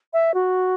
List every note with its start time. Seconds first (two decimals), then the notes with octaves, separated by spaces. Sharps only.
0.13 E5
0.34 F#4